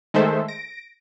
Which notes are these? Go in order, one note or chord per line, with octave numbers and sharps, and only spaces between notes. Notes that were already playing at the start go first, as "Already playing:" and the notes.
D#3 G#3 A3 A4 C5 E5
A#6 D7